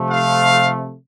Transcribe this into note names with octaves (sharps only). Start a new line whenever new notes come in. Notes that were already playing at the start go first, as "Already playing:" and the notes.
Already playing: C3 F3 A3
F5